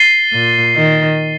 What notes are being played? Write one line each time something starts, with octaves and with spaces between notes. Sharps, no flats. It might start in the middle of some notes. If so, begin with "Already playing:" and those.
Already playing: A6 C7 D#7 G7
A#2
D#3